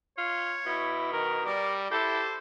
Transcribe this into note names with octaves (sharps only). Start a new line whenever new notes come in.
F4 C#5
B2 E4
D#3 A#4
G3 A#4 D5
E4 G4 A4 C5